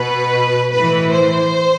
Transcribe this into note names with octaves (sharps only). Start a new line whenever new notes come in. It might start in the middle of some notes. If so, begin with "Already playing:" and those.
Already playing: B2 B4
A2 E3 B4
C5